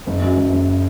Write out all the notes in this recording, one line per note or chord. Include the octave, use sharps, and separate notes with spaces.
F#1
F#2
F#1
F#1